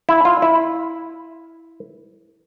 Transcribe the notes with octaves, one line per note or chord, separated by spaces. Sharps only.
E4
F4
E4